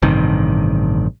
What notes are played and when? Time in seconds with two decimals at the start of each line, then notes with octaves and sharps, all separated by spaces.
0.02 A1 G2 C3 D#3